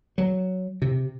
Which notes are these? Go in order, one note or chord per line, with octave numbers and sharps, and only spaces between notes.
F#3
C3